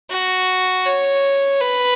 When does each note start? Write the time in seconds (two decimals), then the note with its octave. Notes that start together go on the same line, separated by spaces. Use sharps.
0.11 F#4
0.86 C#5
1.61 B4